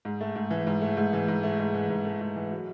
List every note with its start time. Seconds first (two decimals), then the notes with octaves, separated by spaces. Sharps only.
0.05 G#2
0.21 A3
0.35 G#2
0.51 E3
0.67 G#2
0.82 A3
0.97 G#2
1.13 E3
1.28 G#2
1.43 A3
1.59 G#2
1.74 E3
1.89 G#2
2.05 A3
2.21 G#2
2.36 E3
2.51 F#3